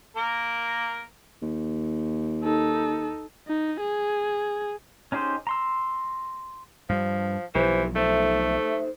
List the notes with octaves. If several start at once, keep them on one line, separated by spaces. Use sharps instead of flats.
A#3 A#4
D#2
D#4 A4
D#4
G#4
C#4 D#4 G4 G#4 C5
A#5 C6 E6
G2 F3 G3
B1 E3 F3 E4 G4 C5
A3 D#4 A4 C5 E5